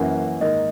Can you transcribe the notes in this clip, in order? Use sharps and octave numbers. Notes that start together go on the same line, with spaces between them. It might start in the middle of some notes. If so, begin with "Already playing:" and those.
Already playing: F#2 E3 A#3 C#4 F#5
G#2 D#3 A#3 D#5